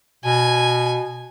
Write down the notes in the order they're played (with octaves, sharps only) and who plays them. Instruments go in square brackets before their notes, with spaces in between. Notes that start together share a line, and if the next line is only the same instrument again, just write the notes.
[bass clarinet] B2 [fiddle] G#5